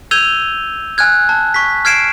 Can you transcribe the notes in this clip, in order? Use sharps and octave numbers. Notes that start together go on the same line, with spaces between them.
E6 G6 G#6 D#7 F7 G7
G#5 F6 F#6 G#6
A5
C#6 B6
F6 G#6 C7 D7 E7